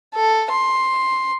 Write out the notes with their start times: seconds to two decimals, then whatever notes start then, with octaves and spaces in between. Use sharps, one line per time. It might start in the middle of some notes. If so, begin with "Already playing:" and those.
0.15 A4
0.51 C6